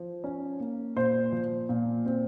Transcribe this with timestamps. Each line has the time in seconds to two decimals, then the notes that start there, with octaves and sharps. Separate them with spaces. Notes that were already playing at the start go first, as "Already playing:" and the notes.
Already playing: F3
0.24 C#4
0.60 A#3
0.96 A#2 C5
1.32 F3
1.69 A#2
2.06 C4